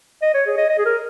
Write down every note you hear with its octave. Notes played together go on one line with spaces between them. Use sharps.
D#5
C#5
G#4
D#5
D#5
G#4
A#4